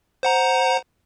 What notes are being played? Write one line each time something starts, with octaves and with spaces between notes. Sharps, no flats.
C5 F#5 A#5